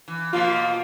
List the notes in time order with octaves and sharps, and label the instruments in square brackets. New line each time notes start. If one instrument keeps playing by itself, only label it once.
[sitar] E3
[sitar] B2 F3 A#3 [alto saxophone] F4